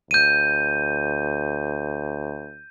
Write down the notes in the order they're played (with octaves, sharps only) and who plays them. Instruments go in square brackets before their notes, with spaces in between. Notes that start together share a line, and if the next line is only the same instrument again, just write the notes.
[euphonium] D2 [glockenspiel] G6 D#7